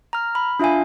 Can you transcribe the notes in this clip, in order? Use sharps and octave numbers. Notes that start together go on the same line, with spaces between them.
A#5 F6
B5
D4 F4 E5 F5 G#5